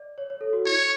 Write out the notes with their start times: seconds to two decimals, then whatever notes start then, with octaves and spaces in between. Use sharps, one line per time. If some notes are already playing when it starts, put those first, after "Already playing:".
Already playing: D5
0.18 C#5
0.30 C#5
0.41 A4
0.53 F#4
0.65 E4 C#5